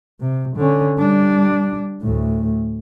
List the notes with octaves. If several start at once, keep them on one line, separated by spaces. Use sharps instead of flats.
C3
D3 C#4
G3 D4
D2 A2